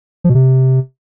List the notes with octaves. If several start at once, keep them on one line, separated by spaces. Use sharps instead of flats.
F3
B2
C3